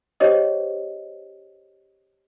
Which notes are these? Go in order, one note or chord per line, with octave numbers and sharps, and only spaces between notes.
C#4 G4 G#4 C5 C#5 D#5